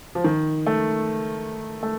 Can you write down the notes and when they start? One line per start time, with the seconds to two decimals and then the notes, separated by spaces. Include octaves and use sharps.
0.15 F3
0.24 D#3
0.66 A3
1.83 A3